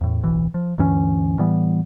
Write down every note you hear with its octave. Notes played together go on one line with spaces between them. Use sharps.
E2 A2
D1 B1 E3
F3
D2 G2 E3 C#4
A2 E3 G3 B3